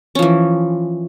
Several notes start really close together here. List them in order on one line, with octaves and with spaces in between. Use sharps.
C#4 F3 E3